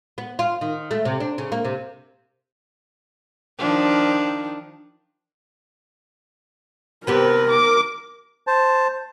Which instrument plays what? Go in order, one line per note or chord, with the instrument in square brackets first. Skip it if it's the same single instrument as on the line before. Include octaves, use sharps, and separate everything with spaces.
[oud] B3
F4
D#3
A3
C3
D4
C#3
A#3
C3
[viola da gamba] D#3 F3 D4
[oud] C3 B3 G4 [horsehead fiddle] A#4 [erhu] B4
[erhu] D6
[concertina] C5 A5